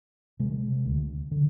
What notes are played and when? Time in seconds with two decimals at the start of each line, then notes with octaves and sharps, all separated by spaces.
0.40 C3 G#3
0.85 D2
1.31 D3